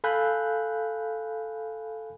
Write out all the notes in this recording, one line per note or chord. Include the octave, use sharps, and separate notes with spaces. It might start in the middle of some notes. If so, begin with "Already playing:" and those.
A4 F5 G#5 B5 F#6 G6